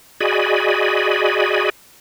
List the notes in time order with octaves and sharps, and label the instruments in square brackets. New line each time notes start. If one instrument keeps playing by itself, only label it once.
[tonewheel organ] F#4 G#4 D5 D#5 G#5 B5